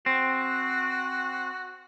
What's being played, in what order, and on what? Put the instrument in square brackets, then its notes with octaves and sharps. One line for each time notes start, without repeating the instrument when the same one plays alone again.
[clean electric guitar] C4 [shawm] F#4